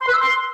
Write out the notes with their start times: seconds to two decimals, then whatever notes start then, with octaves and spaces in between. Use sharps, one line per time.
0.01 C6
0.07 B4
0.13 E6
0.20 C6